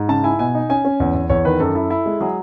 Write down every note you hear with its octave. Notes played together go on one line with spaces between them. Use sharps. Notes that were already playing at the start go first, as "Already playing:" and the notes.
Already playing: G#2
C#3 A5
E4 G#5
B2 G#5
D#4
C#4 G#5
C#4
E2
E2
E2 C#5
D#3 B4
F#2 A4
E4
E4
G#3
F#3 G#4